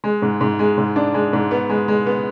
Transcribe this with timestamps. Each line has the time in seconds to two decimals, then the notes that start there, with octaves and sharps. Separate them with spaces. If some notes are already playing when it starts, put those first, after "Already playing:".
0.04 G#3
0.22 G#2
0.41 G#2
0.59 G#3
0.78 G#2
0.96 D4
1.14 G#3
1.33 G#2
1.51 B3
1.69 G#3
1.88 G#3
2.06 B3